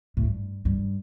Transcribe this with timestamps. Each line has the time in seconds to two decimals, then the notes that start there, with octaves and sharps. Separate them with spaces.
0.17 A2
0.23 G2
0.65 G2